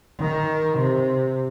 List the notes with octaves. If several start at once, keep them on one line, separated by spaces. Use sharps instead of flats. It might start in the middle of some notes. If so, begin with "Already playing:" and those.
D#3
C3